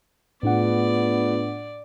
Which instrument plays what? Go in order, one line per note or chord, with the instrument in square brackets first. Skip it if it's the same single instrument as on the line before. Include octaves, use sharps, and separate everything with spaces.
[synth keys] A2 D4 F#5 [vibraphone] A3 F4 G#4 [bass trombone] B3 [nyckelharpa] D5